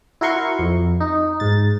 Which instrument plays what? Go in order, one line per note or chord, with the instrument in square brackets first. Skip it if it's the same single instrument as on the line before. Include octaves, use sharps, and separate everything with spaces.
[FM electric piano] E4 F#4 A#4 C6 C#6
F2
D#4
G#2 A6